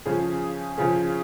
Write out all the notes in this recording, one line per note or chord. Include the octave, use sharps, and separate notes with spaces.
C#3 F3 C#4 G#4
C#3 F3 C#4 G#4